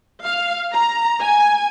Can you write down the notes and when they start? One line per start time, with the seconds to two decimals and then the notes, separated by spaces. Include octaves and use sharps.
0.23 F5
0.72 A#5
1.20 G#5